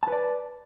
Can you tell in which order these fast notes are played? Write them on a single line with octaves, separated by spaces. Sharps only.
A5 B4 D5